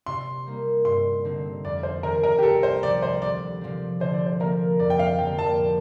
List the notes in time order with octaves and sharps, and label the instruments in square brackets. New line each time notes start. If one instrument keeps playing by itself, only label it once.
[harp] C3 [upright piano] C6
[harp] G3 A#3 D#4
[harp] G2 [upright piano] C6
[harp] D3 A3 C4 D#4
[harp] F2 [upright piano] D5
[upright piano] C5
[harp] D#3 A3 C4 [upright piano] A#4
[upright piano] A#4
G4
[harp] C2 [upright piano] A4
[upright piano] C5
[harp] C3 F3 [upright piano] D5
[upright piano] C5
[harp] D2 [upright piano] D5
[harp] C3 F3 C4
[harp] D3 [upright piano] C5
[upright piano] D5
C5
[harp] F3 A#3 [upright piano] A#4
[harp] F2 [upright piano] D5
[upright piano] G5
F5
[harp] D3 F3 A#3 [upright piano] G5
[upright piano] A5
[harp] A2